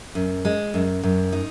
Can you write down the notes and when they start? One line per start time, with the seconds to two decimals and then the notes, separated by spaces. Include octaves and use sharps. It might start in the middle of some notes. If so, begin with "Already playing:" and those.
0.15 F#2
0.45 G#3
0.74 F#2
1.03 F#2
1.32 D#4